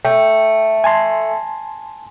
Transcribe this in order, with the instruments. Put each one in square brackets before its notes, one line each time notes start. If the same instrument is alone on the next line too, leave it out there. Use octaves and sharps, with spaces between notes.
[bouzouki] A3 [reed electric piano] G5
[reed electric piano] G#5 A5 C6